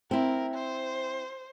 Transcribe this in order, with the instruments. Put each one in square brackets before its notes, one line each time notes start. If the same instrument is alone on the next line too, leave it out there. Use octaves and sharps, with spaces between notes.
[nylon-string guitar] C4 E4 [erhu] A#4
[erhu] C5